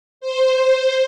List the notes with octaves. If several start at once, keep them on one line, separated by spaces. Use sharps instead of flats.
C5